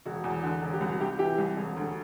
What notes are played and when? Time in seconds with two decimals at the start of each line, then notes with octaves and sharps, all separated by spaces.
0.06 E1 F#4
0.24 E2
0.43 D3
0.62 E1
0.74 G4
0.81 C2 F#4
1.00 C3 G4
1.19 E3 G4
1.38 C2
1.57 E1
1.76 D2